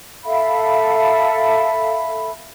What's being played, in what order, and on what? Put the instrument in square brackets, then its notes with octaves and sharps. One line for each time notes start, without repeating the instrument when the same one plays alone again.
[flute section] A4 E5 F5 B5